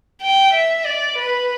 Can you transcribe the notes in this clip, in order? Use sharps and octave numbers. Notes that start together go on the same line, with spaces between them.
G5
E5
D5
B4